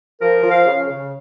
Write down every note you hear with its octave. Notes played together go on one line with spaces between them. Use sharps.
F3 A#4
F3
F5
C#3
C#3